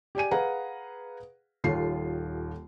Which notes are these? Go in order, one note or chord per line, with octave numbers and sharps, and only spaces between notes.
G4 D5 G#5 D#7
G#4 B4 F5 F#5 A#5
D#1 D#2 F4 A4 C#5 C7